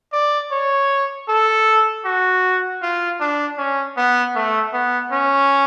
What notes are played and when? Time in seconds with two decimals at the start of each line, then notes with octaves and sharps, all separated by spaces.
0.13 D5
0.51 C#5
1.28 A4
2.05 F#4
2.82 F4
3.20 D4
3.58 C#4
3.97 B3
4.35 A3
4.73 B3
5.12 C#4